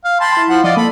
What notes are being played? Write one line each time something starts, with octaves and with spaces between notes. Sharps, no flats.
F5
G5 A5 B5 C6
E4
F3 F#5
F3 F4 D5 D#5
A#3 A4 B5